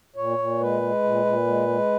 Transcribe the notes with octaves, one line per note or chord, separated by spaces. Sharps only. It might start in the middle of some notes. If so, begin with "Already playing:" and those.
A#2 C#5
A#2
G#3 B4
G#3
A#2
A#2
G#3
G#3